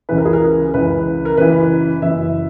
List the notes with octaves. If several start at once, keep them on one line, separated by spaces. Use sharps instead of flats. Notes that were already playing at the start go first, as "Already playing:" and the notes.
C#2 C#3 E3 B4
A#4
G#4
A#4
C#2 C#3 E3 B4
A#4
F#1 F#2 E3 B4
F#1 F#2 E3 E5